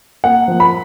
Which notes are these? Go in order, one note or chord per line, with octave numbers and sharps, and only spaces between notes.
A#3 F#5
F3
B5